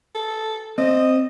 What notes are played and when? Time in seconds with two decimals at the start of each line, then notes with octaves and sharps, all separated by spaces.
0.15 A4
0.78 C4 D#5